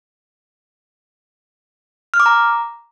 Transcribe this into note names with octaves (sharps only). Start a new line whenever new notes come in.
F6
D6
A#5